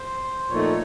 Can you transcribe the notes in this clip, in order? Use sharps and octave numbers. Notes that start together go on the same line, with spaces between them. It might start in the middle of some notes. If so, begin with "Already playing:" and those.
Already playing: C5
A#2 F3 A3 D#4 C#5